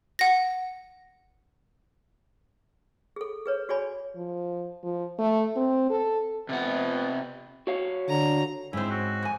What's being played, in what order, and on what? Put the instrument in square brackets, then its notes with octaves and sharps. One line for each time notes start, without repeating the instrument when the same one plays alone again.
[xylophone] F#5 A#6
[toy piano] G#4 A4
G#4 B4 C#5
F#4 G#4 C#5 D5 G#5 B5
[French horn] F3
F3
A3
C4
A4
[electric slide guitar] C3 F#5 [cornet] B3
[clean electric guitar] F#4 C#5 F5
[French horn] D3 [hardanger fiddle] A#5
[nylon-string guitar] G#2 [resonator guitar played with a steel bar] C4 C#4 [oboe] E4
[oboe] F#4
[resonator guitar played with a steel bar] F2 G#5